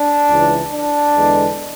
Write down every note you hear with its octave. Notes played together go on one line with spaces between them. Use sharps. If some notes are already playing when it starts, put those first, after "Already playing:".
Already playing: D4
C#2 C#3 E3
D4
E2 D3 G#3 B3